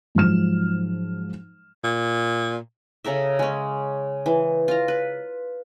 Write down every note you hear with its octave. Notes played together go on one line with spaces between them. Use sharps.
G#2 F3 F#3 F6 E7
A#2
C#3 A4 A#4 E5
G#3 C#4
E3
F4 A#5
B4